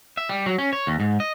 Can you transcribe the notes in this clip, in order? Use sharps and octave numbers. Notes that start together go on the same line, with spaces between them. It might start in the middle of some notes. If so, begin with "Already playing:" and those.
E5
G3
F#3
C#4
C#5
D#2
G#2
D#5